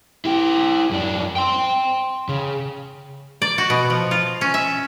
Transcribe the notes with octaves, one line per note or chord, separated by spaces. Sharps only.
E4 G4
F#2 D4
G5 C6
C#3
D5
F#4
B2
F3
F4
C#4
E5